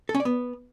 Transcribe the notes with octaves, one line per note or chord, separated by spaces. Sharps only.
A4
C#4
D5
B3